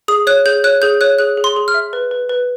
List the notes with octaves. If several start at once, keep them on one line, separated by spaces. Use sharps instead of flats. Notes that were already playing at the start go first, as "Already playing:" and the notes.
G#4 D#6
C#5 F#6
G#4 G6
C#5 F#6
G#4 G6
C#5 F#6
G#4 F#6
G#4
C6
G#4
F6
E5
B4
B4
B4